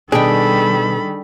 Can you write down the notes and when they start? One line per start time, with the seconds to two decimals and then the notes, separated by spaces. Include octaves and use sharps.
0.12 B2 D#3 G3 D4 G#4 A4 G5 B5